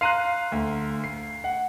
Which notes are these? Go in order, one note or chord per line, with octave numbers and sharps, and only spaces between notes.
F5 A#5 C6 F#6 C7 D#7
D2
C7
F#5